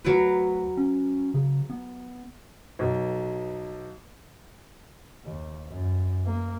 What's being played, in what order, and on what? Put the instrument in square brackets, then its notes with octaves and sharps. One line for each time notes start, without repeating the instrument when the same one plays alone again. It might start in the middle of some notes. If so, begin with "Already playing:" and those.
[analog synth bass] D2 [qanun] F#3 A#4 B4
[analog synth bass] C#4
C#3
B3
[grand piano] B1
[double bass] D#2
F#2
A#3